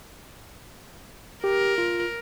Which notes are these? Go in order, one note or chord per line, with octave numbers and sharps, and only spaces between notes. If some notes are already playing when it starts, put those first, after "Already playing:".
G4 A#4
F4